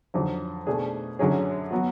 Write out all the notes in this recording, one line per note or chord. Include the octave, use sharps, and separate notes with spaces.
F2 D3 F#3
B2 A3 D4 G#4
F#2 D3 F#3 C#4 G#4
F#3 B3 F#4